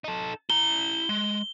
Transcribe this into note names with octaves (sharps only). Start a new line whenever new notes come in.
D#4 A4
E4 A#5 G7
G#3